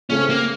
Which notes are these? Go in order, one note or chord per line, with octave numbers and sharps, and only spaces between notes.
C#3 A3 C4 C#4
A#3